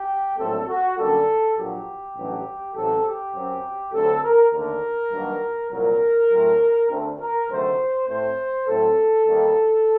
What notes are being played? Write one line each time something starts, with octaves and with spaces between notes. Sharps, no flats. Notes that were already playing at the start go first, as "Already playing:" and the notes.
Already playing: G4
A#1 A2 F#3 A3 C4 A4
F#4
F#2 D3 G3 A#3 A4
A#1 A#2 F#3 G4
A1 G2 F#3
A1 A2 F#3 A3 C4 A4
G4
F#2 F#3 C4
D2 D3 F#3 C4 A4
A#4
D#2 D3 A3 A#4
G2 D#3 F#3 A#3
C2 A#2 F#3 A#4
A2 F#3 A3 C4
D2 D3 A3 C4
A#4
D2 C3 D#3 F#3 A3 C5
A2 A3 C4 C5
A2 F#3 A3 C4 A4
D#2 D#3 G3 A#3